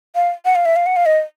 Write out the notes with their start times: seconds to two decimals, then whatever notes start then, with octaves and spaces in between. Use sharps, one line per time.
0.15 F5
0.45 F#5
0.55 F5
0.65 E5
0.76 F5
0.86 F#5
0.96 F5
1.06 D#5